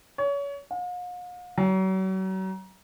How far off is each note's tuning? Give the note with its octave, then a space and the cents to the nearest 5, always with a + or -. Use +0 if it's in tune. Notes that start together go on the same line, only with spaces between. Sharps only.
C#5 +30
F5 +45
F#3 +40